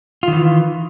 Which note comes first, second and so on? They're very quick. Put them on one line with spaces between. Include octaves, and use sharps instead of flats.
F4 D#3 E3